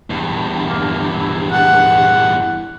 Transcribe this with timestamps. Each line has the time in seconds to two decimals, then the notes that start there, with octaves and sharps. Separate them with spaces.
0.10 E2 G2
0.68 A#3
1.13 E4
1.52 F#5